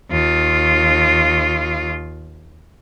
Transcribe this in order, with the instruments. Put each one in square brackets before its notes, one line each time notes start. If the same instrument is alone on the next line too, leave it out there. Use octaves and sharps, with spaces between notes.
[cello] D#2 F4